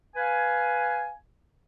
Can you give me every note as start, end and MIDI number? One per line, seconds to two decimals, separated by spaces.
0.16 1.12 71
0.16 1.12 77
0.16 1.12 80